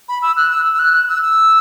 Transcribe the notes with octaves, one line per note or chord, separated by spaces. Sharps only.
B5
E6
F#6
E6
E6
F#6
F#6
E6
E6